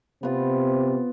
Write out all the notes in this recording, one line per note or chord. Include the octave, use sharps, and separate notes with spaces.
C3 B3 C4 F4